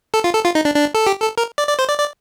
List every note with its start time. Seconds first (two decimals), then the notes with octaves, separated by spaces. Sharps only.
0.14 A4
0.24 F4
0.34 A4
0.44 F4
0.55 D#4
0.65 D4
0.75 D4
0.94 A4
1.07 G4
1.22 A4
1.38 A#4
1.58 D5
1.68 D5
1.79 C5
1.89 D5
1.99 D5